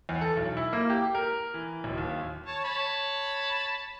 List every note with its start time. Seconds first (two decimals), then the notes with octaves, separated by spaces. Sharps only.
0.09 E2
0.21 A4
0.37 B1
0.57 E4
0.73 A#3
0.90 G4
1.15 A#4
1.54 E3
1.84 D1
1.98 D#2
2.46 C#5 A5
2.65 C#5 A5 B5